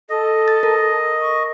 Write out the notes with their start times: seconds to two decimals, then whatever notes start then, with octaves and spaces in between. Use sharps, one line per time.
0.09 A4 D#5
0.48 A6
0.63 A#4
1.21 C#6